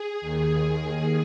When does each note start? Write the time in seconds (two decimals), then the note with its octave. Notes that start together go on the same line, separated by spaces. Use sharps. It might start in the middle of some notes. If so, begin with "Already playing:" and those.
Already playing: G#4
0.21 D#2 D#3